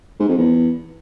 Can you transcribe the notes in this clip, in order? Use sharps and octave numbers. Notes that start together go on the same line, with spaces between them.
G#2
F2
E2